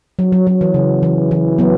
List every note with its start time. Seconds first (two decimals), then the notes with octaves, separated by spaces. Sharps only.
0.19 F#3
0.32 F#3
0.47 F#3
0.61 E3
0.74 C#3
1.03 E3
1.31 E3
1.58 F#3 B3